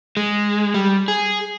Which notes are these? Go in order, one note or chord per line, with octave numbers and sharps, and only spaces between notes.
G#3
G3
G#4